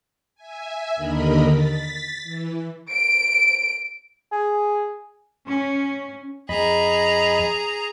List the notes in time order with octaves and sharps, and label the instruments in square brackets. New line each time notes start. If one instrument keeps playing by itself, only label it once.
[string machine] E5 G#5
D#2 D3 A#4 D#5 B5
A6 B6
E3
[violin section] D7
[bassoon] G#4
[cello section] C#4
[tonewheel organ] F2 D#5 B5 [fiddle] G#4 A#5